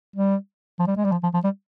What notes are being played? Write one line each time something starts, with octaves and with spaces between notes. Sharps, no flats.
G3
F3
G3
G#3
G3
F3
F3
F3
G3